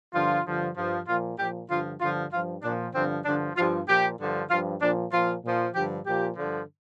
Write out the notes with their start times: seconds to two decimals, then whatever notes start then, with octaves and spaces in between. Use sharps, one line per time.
0.13 G2 D3 F3 F4
0.45 G2 D3 F3
0.76 G2 F3
1.06 A#2 F3 F4
1.38 A#2 F3 G4
1.69 G2 D3 F3 F4
2.00 G2 D3 F3 F4
2.31 G2 F3 F4
2.62 A#2 F3 D4
2.94 G2 D3 F3 C4
3.24 G2 D3 F3 D4
3.56 G2 F3 F4
3.87 A#2 F3 G4
4.18 G2 D3 F3
4.49 G2 F3 F4
4.81 A#2 F3 D4
5.11 A#2 F3 F4
5.43 A#2 F3
5.74 G2 D3 F3 G4
6.05 A#2 F3 G4
6.36 G2 D3 F3